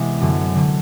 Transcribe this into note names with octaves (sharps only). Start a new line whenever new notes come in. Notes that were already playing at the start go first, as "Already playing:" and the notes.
Already playing: C3 E3 G#3 B3
F#2 D3 F#3
D3 F#3